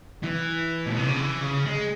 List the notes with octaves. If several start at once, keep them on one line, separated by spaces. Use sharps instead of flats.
E3
A#2
C3
C#3
E3
C#3
G#3